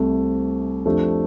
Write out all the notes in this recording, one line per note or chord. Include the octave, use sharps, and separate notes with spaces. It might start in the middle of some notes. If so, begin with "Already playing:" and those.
Already playing: C2 C3 A3
F2 F3 A3 D4 G4